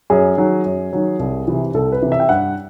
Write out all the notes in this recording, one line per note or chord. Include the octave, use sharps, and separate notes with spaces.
F#2 G#4
D#3 F#3
F#2
D#3 F#3
C2
C3 E3
C2 A4
B4
C3 E3
E5
G5
G2 F#5